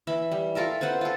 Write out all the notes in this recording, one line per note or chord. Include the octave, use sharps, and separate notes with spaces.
E3 E5 B5
G3
F4 A4 A#4 E5
C4 B4 C5 F#5
F4 A4